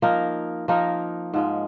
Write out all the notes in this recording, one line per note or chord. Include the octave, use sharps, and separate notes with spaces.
F3 A#3 D#4 A#4
F3 A#3 D#4 A#4
G#2 F3 G#3